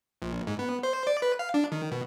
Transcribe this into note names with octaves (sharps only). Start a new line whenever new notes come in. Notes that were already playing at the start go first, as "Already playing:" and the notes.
A#1
G#2
B3
C5
D5
B4
F5
D4
D#3
B2